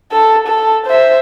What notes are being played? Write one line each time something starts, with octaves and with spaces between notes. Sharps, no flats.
A4
A4
C5 E5